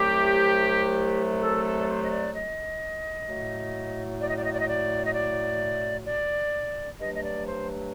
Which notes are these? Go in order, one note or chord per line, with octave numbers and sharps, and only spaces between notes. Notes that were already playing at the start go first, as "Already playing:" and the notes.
Already playing: C2 C3 F#3 A3 G4
A4
A4
D5
C5
D#5
D5
D#5
A2 F#3 A3
D5
D#5
D5
D#5
D5
D#5
D5
D#5
D5
D5
G2 F#3 A3 D#5
D#5
D5
C5